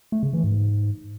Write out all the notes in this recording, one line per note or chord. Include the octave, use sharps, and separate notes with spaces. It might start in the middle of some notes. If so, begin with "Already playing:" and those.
A3
C#3
E3
G#2